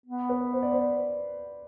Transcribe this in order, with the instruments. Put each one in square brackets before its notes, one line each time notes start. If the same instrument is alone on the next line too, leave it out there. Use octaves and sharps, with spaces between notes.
[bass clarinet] B3
[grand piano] B4
C5
D5
C5